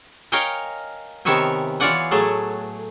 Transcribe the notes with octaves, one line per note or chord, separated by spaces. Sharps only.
A#4 C#5 D#5 F5 G5 G#5
C3 D#3 B3 C#5 E5 G#5
E3 F4 C#5 D5 F#5 G#5
A2 F#3 A3 G#4 A5